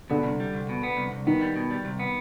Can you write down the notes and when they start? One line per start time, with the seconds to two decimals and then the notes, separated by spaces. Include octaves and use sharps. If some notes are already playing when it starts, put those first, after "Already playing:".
0.10 B2 D3
0.24 C2
0.40 G3
0.54 C2
0.69 B2
0.83 B3
0.97 C2
1.12 C2
1.27 D#3 B3
1.41 G3
1.56 B2
1.71 G3
1.85 C2
1.99 B3